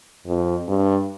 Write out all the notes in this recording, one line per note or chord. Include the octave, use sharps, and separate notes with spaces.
F2
G2